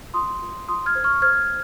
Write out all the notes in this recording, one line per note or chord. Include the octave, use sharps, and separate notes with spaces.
F4 C6 D#6
F4
F4 C6 D#6
F6 G#6
C5
C#6 F6
C5 F6 G#6